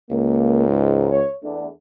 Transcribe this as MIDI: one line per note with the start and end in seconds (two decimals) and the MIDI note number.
0.10 1.21 37
0.10 0.67 58
0.68 1.08 44
1.10 1.31 73
1.43 1.65 40
1.43 1.65 57
1.43 1.65 62